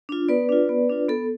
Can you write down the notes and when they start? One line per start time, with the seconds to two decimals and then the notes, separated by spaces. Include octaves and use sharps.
0.09 D4 F4
0.29 B3 B4 D5
0.49 D4 F4
0.69 B3
0.89 D4 F4
1.09 B3 A4